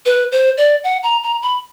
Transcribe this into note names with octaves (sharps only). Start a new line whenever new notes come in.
B4
C5
D5
F#5
A#5
A#5
B5